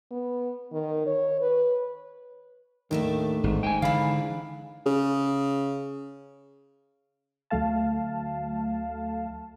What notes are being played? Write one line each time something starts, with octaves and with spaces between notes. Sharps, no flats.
B3
D#3
C#5
B4
D#2 A2 D#3 A3 D4
G#1 G#2
G#3 G5 G#5
D3 E3 D4 F5 B5
C#3
D2 F#3 A3 F5 A5